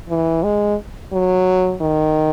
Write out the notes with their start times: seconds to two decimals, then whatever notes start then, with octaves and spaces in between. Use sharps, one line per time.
0.09 E3
0.43 G#3
1.13 F#3
1.82 D#3